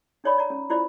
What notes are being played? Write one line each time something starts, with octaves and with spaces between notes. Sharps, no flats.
D4 D#4 C#5 D5 B5
D5 A#5
C#4
E4 F4 C5 D5 B5